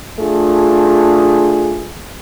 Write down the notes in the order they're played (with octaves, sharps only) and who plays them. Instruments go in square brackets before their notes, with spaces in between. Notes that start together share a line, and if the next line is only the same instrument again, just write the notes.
[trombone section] A3 D4 F4 G#4